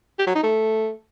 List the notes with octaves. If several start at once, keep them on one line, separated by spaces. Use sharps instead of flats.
G4
F#3
D#4
A3